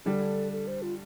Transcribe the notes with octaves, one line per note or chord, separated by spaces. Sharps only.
D3 G3 D4 A4
A4
C5
F4